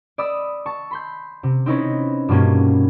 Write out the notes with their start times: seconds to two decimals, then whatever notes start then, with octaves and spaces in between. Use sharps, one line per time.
0.18 D5 B5 D#6 E6
0.66 A5 C#6
0.91 B5 C6 G6
1.43 C3
1.66 C4 C#4 D#4 E4 B4 C#5
2.28 G2 B2 G3 A#3 C#4 F4